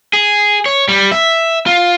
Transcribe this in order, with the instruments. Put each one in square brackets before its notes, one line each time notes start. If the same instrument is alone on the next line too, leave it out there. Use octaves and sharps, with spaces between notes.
[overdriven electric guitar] G#4
C#5
G3
E5
F4